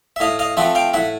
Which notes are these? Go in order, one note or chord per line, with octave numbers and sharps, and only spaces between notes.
E5
A2 D#5 F5
D#5 F5
F3 A3 C4 E5 F#5
F5 G5
A2 E5 F#5